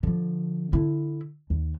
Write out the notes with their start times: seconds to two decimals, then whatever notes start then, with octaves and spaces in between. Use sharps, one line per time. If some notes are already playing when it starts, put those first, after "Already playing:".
0.03 D3 F3
0.73 D3 E4
1.50 D#2